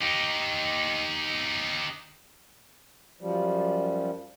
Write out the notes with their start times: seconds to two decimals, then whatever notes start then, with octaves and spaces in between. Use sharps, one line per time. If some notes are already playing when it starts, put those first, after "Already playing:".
0.01 D#4 G4
3.21 F#2 F3 G3